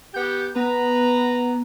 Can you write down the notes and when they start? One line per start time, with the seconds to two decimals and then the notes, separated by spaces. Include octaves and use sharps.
0.14 B3 G4 G6
0.56 B3 B4 A#5